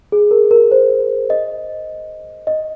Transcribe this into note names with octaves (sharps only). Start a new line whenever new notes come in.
G#4
A#4
A#4
C5
D#5
D#5